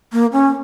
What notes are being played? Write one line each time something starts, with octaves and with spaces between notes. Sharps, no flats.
A#3
C#4